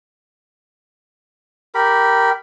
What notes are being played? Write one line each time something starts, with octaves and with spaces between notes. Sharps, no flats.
G4 A#4 B5